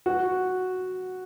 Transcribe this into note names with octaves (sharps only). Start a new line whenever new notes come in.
F#4